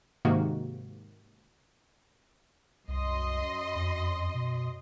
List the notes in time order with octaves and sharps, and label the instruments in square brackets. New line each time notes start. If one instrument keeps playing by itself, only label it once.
[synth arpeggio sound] G#2 C3 D#3 A#3 F#4
[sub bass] C2 [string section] F#2 D#5 C6
[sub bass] F2
B2